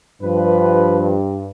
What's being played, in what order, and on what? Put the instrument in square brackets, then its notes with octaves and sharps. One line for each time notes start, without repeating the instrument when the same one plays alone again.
[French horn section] G2 [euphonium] F3 [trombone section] B4